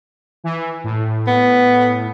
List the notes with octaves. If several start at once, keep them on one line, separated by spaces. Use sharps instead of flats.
E3
A2
B3